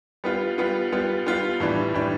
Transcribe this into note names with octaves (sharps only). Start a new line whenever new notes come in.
G3 B3 F4
G3 B3 F4
G3 B3 F4
G3 B3 F4
A2 E3 G3 D4
A2 E3 G3 D4